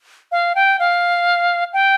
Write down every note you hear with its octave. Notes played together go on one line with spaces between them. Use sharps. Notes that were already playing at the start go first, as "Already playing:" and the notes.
F5
G5
F5
G5